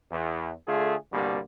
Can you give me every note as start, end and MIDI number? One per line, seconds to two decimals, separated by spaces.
0.12 0.52 40
0.68 0.95 50
0.68 0.95 57
0.68 0.95 65
0.68 0.95 68
1.12 1.39 36
1.12 1.39 43
1.12 1.39 47
1.12 1.39 50
1.12 1.39 55
1.12 1.39 58